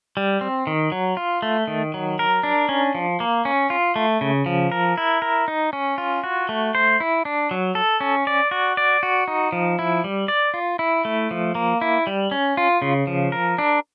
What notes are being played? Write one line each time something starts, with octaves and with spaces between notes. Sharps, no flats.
G3
C4
D#3
F#3
F4
A3
D#3
F#3
A#4
D4
C#4
F3
A#3
C#4
F4
A3
C#3
F3
A#4
E4
A#4
D#4
C#4
F4
F#4
A3
C5
E4
D4
F#3
A4
C#4
D5
F#4
D5
F#4
D#4
F3
E4
G3
D5
F4
E4
A3
F3
A#3
E4
G3
C#4
F4
C#3
F3
A#4
D4